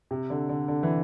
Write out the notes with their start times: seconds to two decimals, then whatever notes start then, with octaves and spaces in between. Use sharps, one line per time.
0.11 C3
0.30 D3
0.49 D3
0.68 D3
0.83 E3